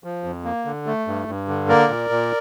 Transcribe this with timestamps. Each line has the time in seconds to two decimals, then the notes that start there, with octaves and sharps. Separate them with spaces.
0.04 F3
0.24 F2
0.44 A#3
0.65 D3
0.87 A3
1.07 G2
1.28 G2
1.48 D3
1.69 A#3 A#4 D5
1.89 A#2
2.10 A#2